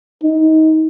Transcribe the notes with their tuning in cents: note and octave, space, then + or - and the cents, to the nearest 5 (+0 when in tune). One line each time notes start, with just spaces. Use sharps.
D#4 +25